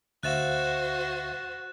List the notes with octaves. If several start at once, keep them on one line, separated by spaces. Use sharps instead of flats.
D2 F#4 C5 E5 F5 F#6 A6 E7